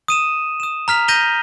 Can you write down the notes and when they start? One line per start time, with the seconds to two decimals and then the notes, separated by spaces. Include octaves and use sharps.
0.08 D#6 D#7 E7
0.60 D#6 E7
0.88 A#5 F6 B6 F7
1.08 G6 A#6 D#7 F7 G7